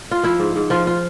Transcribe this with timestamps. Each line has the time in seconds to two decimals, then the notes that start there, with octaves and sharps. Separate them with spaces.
0.11 F4
0.23 F3 E4
0.40 G#2
0.56 G#2
0.70 F3 F4
0.87 F4